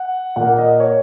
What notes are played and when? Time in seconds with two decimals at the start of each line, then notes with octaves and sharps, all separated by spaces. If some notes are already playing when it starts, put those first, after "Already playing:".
Already playing: F#5
0.36 A#2 A#3 F#5
0.58 D#5
0.80 C#5